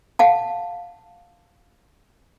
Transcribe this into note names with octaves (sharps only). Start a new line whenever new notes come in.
F5 F#5 A5